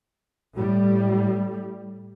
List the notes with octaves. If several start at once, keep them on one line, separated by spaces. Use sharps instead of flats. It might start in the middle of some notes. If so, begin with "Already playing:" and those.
A2 G3